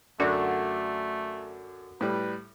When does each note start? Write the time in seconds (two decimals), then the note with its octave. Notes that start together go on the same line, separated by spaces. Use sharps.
0.20 F#2 D3 A3 D4 F#4
2.01 A2 G3 B4